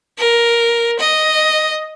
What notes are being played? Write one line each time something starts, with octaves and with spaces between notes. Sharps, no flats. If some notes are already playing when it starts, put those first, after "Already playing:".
A#4
D#5